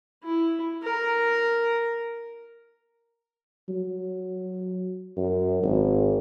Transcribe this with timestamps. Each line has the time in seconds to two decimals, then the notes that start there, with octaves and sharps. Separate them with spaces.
0.24 E4
0.83 A#4
3.69 F#3
5.17 F#2
5.63 G#1